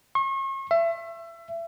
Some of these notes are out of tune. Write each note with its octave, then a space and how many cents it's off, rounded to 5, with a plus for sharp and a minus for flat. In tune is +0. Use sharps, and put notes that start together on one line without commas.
C#6 -40
E5 +25